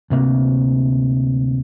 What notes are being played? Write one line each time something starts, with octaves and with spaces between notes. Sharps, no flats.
D2 C3 A#3